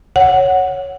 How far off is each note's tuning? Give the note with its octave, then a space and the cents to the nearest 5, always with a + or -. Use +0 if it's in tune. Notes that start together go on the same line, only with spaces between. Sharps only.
C#5 +0 F#5 +0